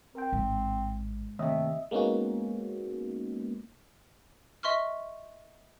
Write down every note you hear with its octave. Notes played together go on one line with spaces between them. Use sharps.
C4 A#4 G5
A1 G#2
D#2 C3 A3 D#5 E5
G#3 A#3 B3 C#4 D#4 F#4
D#5 E5 C6 C#6 F6